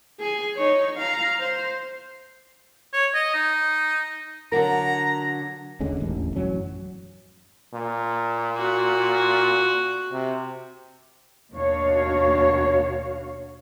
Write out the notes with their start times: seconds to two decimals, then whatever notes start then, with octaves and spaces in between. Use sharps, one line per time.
0.20 G#4 G#5
0.56 D#4 C#5
0.97 F5 A#5
1.40 C5
2.93 C#5
3.14 D#5
3.34 D#4
4.52 D3 F#3 A#4 A#5
5.80 D#2 D3 G#3 C#4
6.00 E1 A1 D#2
6.36 A1 F#2 F#3 C#4
7.74 A#2
8.58 F#4
10.12 C3
11.53 D#2 B2 D4 F#4 C#5 F5